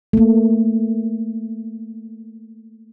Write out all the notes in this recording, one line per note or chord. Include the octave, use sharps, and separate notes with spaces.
A3 A#3